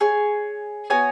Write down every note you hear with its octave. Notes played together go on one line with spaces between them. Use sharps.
G#4 C#5 G#5
B3 F#4 C#5 G#5